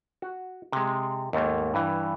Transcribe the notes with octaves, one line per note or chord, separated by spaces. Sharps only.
F#4
C3 G#3
D#2 G#2 A3 A#3
G2 E3